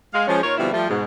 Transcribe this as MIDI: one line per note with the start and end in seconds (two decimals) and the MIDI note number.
0.13 0.27 56
0.13 0.27 77
0.28 0.43 53
0.28 0.43 56
0.28 0.43 61
0.43 0.57 46
0.43 0.57 63
0.43 0.57 65
0.43 0.57 70
0.43 0.57 73
0.58 0.70 47
0.58 0.70 50
0.58 0.70 53
0.58 0.70 55
0.58 0.70 60
0.58 0.70 64
0.71 0.88 53
0.71 0.88 55
0.71 0.88 57
0.89 1.04 44
0.89 1.04 47
0.89 1.04 56